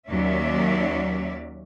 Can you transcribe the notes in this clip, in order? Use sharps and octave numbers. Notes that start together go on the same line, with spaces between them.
D#2 F#3 A#3 C#4 D5 E5